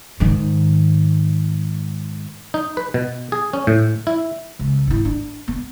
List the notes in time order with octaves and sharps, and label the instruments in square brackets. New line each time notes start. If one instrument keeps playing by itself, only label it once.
[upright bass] G#2 D#3
[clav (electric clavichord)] D#4
B4
B2
G#4
C#4
A2
E4
[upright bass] C#2
G#1 E4
D4
B3